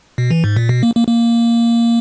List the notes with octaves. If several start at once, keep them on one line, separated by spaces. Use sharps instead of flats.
B2
E3
G#2
A#2
B2
A#3
A#3
A#3